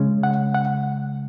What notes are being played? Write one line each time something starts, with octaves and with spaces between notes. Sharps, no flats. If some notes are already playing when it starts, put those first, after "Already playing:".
Already playing: C#3 G#3 C#4
F#5
F#5